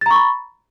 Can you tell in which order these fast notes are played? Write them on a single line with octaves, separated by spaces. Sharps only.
A6 A#5 C#6 B5